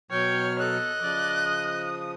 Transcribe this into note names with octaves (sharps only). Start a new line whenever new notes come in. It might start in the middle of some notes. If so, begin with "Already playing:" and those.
B2 F#3 C#5 G5 F6
A4 D#5 F#6
C#3 F3 D5
D#6